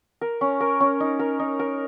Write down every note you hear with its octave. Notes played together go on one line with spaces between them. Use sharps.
A#4
C#4
A#4
C#4
D#4
A#4
D#4
A#4